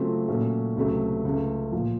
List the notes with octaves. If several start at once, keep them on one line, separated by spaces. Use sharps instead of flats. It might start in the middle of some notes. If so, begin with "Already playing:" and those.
Already playing: C#3 F#3 A3 C4 F4
A#2 F#3 A3 C#4
C#2 C3 F#3 A3 C4
C#2 C#3 A3
A#2 F3